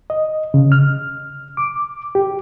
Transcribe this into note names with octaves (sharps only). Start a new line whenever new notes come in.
D#5
C#3
F6
D6
G4